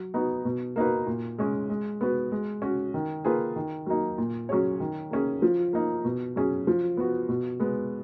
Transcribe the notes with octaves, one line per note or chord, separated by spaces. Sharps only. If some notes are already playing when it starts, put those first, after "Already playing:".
Already playing: F#3
B3 D#4 F#4
B2
A#3 D#4 F#4 B4
A#2
G#3 C#4 G#4
G#3
B3 F#4 B4
G#3
C#4 F#4
D#3
A#3 F4 G#4 B4
D#3
F#3 A#3 D#4
A#2
F#3 C#4 G#4 C#5
D#3
A#3 C#4 G#4
F3
A#3 D#4
B2
F#3 C#4 G#4
F3
B3 F#4
B2
G#3 B3